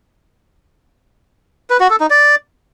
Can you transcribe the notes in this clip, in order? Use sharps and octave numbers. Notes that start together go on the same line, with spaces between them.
B4
F#4
A4
D#4
D5